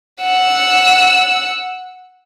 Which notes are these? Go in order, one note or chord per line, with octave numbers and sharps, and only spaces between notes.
F#5 E6